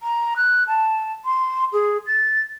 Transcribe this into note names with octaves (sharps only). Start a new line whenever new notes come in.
A#5
F#6
A5
C6
G#4
A6